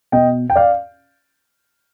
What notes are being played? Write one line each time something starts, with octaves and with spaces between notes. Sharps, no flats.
B2 D#5 G5
G5
D5 F5